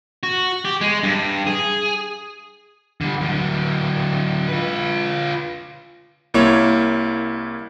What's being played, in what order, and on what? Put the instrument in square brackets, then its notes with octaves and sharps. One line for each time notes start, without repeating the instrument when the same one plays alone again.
[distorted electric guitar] F#4
G4
G#3
G2
G#4
[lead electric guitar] D3 G3
D3 F#3
F4 B4
[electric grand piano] C2 A#3 E4 C#5